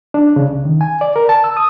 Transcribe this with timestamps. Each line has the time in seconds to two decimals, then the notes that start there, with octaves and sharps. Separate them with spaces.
0.14 D4
0.36 C#3
0.49 C2
0.65 D#3
0.81 G#5
1.01 D5
1.16 A#4
1.29 A5
1.44 E6
1.57 D#6